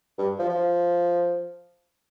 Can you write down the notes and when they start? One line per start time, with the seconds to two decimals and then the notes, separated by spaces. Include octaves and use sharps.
0.18 G2
0.39 F3
0.49 F3